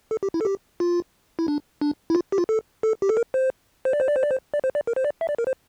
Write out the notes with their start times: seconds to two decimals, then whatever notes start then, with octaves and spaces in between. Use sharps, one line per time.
0.11 A4
0.23 G4
0.34 E4
0.41 A4
0.45 G4
0.80 F4
1.39 E4
1.48 D4
1.81 D4
2.10 E4
2.15 F4
2.32 G4
2.38 F4
2.49 A4
2.83 A4
3.02 G4
3.09 A4
3.17 A#4
3.34 C5
3.85 C5
3.93 D5
4.00 C5
4.08 D5
4.16 C5
4.23 D5
4.31 C5
4.54 D5
4.64 C5
4.75 D5
4.87 A#4
4.96 C5
5.05 D5
5.21 E5
5.29 D5
5.38 A#4
5.47 C5